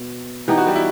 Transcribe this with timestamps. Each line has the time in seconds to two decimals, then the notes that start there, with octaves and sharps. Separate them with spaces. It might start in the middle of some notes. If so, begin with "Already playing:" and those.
Already playing: B2
0.48 E3 B3 D#4 G4
0.58 F#4
0.67 G3 G4
0.75 E4